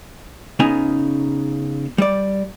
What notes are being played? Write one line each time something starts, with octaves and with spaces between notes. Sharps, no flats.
C#3 B3 D#4 G#5
G3 D5